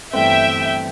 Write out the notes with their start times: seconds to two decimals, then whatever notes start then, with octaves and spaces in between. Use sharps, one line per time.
0.13 G1 G2 E3 A3 C4 E5 G5